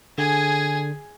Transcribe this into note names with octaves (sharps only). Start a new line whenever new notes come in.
D3 G#4 G#5